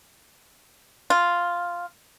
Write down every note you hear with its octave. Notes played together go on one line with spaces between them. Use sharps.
F4